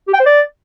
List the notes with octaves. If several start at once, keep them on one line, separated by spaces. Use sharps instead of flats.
G4
G5
C5
D5